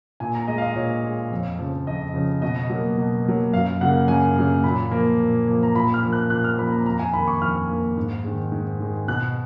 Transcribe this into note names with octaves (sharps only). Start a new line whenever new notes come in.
A#2 G#5
A#5
G#3 D#5
F5
D#5
A#2 C#5
G#3
F2
C#3 F3
F2 D#5
C#3 F3
B2 D#5
F#3 A#3
B2
F#3 A#3
F#2 F5
C#3 F#3 A#3 F#5
F#2 G#5
C#3 F#3 A#3
A#2 B5
F3 A#3
A#2
F3 A#3
A#5
A#2 B5
F6
F3 A#3
F#6
A#2 F#6
F6
F3 A#3 B5
A#5
F2 A#5
G#5
D#3 A#3 B5
C#6
F2 F6
D#3 A#3
G#2
D#3 G#3
G#2
D#3 G#3
B2 F#6